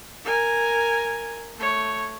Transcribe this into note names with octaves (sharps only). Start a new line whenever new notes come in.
A#4 G#5
A3 C#5